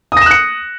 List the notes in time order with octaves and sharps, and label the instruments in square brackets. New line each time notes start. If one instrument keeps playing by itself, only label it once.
[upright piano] D#6
A#6
E7
F#6
C#7